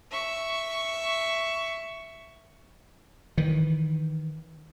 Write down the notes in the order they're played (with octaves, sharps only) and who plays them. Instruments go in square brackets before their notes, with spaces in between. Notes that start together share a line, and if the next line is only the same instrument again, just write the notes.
[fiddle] E5 C#6
[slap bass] D#3 E3